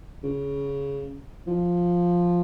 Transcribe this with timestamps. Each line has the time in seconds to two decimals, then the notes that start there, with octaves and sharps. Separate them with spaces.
0.24 C#3
1.47 F3